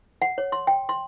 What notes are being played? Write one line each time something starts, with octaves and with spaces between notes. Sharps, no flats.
F#5
C#5
C6
G5
C6